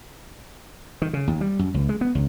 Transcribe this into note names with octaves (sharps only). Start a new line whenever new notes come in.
D#3
C#3
D#2
G3
F#2
C#2
G#3
B3
C#2